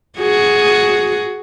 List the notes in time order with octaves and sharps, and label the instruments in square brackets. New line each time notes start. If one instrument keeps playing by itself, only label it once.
[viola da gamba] F#4 G#4